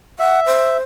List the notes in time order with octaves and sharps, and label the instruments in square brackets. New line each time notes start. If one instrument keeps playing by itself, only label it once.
[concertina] E5 [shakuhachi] F#5
[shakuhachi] C5